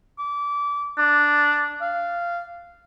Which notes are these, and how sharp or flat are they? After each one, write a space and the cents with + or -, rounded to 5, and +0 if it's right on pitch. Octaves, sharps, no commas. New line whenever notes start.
D6 -25
D4 +0
F5 -15